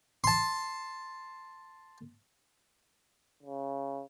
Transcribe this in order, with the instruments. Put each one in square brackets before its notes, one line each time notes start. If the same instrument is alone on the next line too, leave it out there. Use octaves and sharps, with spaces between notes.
[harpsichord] A5 C6
[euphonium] C#3